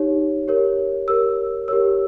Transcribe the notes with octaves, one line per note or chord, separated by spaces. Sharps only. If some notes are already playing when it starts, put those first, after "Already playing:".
Already playing: D#4 G4 C#5
G4 A#4 C#5
G4 A#4 C#5 E6
G4 A#4 C#5 E6